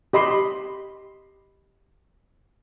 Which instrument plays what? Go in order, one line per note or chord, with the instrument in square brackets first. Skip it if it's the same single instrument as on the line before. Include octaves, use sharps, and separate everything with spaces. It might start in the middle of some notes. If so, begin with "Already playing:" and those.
[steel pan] G4 D#5 B5 C6